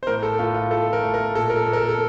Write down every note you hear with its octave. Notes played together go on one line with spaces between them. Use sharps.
C5
A2 A#4
A4
A2 F4
F4
A3 A4
A#4
A3
A#4
A#2 A4
A#4
A4
A#2
A#4
A4
A4